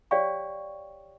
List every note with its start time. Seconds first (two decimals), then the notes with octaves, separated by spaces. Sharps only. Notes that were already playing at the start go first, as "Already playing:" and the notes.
0.11 G4 C#5 D5 F5 G5 C#6